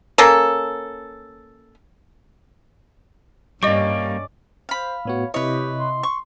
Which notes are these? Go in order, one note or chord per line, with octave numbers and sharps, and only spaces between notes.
A#3 C#4 A4
G2 G3 A#3 C#4 D5 D#5 C#6
C5 F5 B5
A2 B3 F#4 C#5
C3 E4 G4 B4 C#5 D#5
C6
C#6